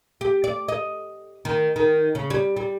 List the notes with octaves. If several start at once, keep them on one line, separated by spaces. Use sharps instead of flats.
G4
D5
D#5
D#3
D#3
C#3
G3
G3